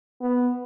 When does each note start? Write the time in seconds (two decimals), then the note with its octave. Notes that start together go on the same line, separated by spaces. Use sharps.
0.21 B3